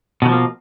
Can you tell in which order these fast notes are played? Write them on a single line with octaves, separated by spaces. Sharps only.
B2 D#3 F3 A#3